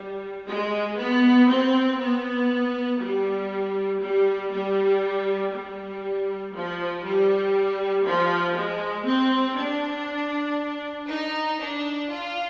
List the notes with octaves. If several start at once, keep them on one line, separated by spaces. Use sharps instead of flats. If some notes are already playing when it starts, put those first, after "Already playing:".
Already playing: G3
G#3
B3
C4
B3
G3
G3
G3
G3
F3
G3
F3
G#3
C4
D4
D#4
D4
F4